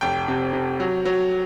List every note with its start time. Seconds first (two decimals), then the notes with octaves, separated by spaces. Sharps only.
0.01 F1 G5
0.28 C3
0.53 C3
0.80 F#3
1.05 F#3